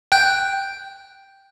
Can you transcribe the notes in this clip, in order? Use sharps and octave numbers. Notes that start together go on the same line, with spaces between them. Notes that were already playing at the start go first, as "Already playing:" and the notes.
G5 F#6 G6